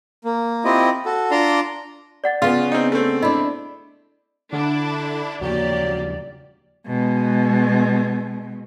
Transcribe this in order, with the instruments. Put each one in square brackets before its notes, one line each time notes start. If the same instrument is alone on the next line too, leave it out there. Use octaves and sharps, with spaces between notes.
[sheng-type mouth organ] A#3
C4 E4 F4 G4 D#5
F#4 A4
D4 F4 D5 A#5 C6
[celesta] D5 F#5 A6
[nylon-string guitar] C#3 B3 C#4 [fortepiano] F4
[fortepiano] C4 D#4
A3 C4
[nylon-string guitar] D4 E4 [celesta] D#5 B5
[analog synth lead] D3 [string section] D4 E4
[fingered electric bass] D#2 C#3 F3 [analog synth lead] F#3 [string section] A#3 G4 [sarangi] D5
[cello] B2 G#3